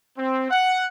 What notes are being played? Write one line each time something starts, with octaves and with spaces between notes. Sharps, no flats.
C4
F#5